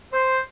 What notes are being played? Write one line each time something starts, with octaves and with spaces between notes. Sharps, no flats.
C5